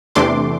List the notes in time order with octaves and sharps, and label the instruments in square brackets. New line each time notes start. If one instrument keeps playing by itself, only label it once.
[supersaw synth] E2 C3 E3 A3 D4 C6 D6